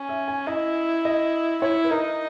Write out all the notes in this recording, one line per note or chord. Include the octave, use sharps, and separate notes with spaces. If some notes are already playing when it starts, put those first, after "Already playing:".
Already playing: C#4
E5
G#5
E4 D#5
D#5
E4 C#5
B4
D#4 A#4